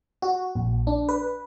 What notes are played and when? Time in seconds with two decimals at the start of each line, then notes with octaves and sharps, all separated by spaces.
0.22 F#4
0.55 A#1
0.87 D4
1.09 B4